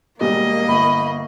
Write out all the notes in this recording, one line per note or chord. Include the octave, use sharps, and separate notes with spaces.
E1 E2 G3 A#3 D#5
G1 B5